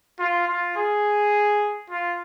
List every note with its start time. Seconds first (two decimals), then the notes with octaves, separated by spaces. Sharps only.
0.19 F4
0.48 F4
0.76 G#4
1.90 F4